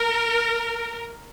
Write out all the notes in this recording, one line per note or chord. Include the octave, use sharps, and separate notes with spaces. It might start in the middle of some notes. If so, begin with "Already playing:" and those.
Already playing: A#4